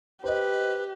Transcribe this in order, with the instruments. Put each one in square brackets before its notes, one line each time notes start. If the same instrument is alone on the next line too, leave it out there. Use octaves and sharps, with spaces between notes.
[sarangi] G4 [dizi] B4 [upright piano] C5 D#5